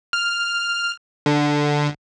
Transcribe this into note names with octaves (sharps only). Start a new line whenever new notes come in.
F6
D3